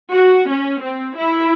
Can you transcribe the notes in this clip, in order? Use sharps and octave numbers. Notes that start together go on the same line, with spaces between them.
F#4
C#4
C4
E4